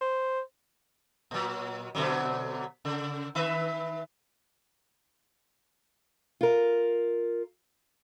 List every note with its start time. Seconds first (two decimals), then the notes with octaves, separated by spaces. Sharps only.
0.01 C5
1.31 A#2 F#3
1.95 B2 D3 F#3
2.85 C#3
3.35 D#3 B4 E5
6.41 F4 A#4